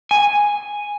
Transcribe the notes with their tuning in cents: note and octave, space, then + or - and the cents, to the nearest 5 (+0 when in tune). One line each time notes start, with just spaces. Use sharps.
G#5 -5